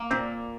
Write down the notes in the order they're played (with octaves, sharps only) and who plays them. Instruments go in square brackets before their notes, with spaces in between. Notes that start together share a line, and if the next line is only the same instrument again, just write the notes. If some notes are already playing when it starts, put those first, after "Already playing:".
Already playing: [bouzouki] A#3
[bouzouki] A#2 [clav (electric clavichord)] C4